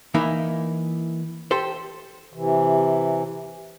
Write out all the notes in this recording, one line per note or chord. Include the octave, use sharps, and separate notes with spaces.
E3 A#3 D#4 E4
G4 A4 C5
C3 E3